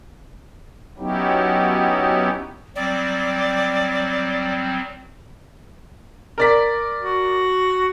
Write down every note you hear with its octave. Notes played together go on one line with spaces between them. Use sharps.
F#3 B3 C#4 D#4 E4 G4
F#3 G3 C4 D5
A#4 D5 B6
F#4